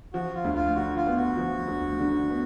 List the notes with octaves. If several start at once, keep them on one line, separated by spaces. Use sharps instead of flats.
F3 F#4
F4
D2
F4
D3 F#4
F4
B3
F#4
F3
D2
D3
B3